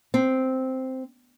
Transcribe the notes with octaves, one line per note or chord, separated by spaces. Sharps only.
C4